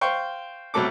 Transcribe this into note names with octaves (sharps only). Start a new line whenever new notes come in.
C5 F5 G5 C#6
C2 B2 F#3 A3 A4 D6